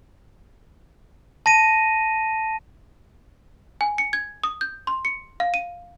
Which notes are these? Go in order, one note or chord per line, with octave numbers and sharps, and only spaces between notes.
A5 A#6 D#7
G#5
C#7
G#6
D#6
G6
C6
C#7
F5
D#7